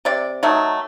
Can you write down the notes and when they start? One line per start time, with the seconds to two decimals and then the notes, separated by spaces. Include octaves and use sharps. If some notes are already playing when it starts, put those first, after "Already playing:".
0.05 C3 D5
0.43 D#3 F#3 A3